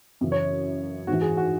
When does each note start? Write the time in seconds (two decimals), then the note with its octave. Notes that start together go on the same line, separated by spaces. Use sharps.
0.21 F#2 C#3 E3
0.32 C#5
1.07 G#2 E3 F#4
1.22 G#4
1.37 F#4